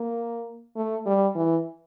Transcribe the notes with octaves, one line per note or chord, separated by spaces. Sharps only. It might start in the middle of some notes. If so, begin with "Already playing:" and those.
Already playing: A#3
A3
G3
E3